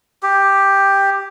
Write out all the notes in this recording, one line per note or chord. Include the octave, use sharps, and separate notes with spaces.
G4